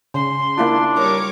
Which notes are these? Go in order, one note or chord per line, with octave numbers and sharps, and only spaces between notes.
C#3 C6
A#3 D4 E4 F4
G3 A#4 C#5 D6